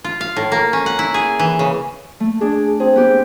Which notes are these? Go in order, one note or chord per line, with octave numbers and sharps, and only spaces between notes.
F4
F5
A2
A#3
C#4
F#5
E4
G#4
E3
C#3
A3
D4 G#4
C4 G#4
B3 G4